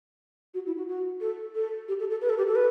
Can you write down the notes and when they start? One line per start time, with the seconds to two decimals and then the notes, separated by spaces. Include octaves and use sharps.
0.54 F#4
0.66 E4
0.77 F#4
0.89 F#4
1.21 A4
1.55 A4
1.88 G4
2.00 A4
2.10 A4
2.21 B4
2.29 A4
2.38 G4
2.47 A4
2.55 B4